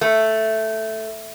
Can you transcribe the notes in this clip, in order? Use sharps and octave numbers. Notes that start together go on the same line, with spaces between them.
A3